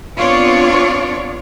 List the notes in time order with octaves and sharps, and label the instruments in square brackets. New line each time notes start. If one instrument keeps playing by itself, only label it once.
[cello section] B3 C4 D4 F4 C#5 D5